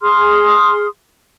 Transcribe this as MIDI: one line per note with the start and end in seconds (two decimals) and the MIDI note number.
0.01 0.86 68
0.01 0.86 84
0.01 0.86 87
0.01 0.86 89